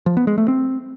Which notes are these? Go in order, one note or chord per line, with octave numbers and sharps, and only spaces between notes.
F3
B3
G#3
A3
C4